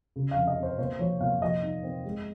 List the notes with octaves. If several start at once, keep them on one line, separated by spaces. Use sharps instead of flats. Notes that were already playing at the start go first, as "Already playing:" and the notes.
C#3
F2 F5
D#5
C4
C5
A#2 C5
F3 C#5
A#2 F5
F3 D#5
D#4
C4
G#3